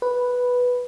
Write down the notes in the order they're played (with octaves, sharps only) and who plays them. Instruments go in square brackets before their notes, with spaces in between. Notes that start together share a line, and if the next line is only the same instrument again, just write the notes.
[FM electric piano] B4